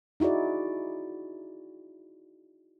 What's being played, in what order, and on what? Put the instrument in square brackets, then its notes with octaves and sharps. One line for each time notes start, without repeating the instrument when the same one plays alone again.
[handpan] D#4 E4 F#4 G#4 D5